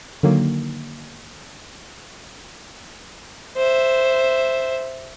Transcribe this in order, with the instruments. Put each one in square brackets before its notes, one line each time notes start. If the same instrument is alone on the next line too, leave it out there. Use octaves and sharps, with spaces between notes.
[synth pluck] D3 D#3 F#3 A#3
[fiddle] C5 E5